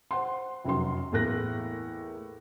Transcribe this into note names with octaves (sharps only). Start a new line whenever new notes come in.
C5 F#5 C6
F1 F#2 F#3 C6
E2 A2 A#3 A#4 F#6 A#6